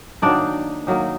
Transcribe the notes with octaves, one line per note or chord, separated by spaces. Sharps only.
D#3 F#3 A#3 D4 D#4 D5
D#3 F#3 A#3 D#4